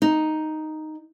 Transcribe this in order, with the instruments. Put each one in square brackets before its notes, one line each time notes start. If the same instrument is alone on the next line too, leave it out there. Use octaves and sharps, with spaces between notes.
[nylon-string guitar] D#4